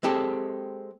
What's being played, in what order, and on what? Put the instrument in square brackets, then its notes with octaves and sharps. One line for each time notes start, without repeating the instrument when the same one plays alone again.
[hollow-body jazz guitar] G#3 C4 G4 A4